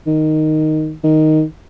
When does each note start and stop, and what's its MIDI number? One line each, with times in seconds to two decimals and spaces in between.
0.07 0.94 51
1.04 1.43 51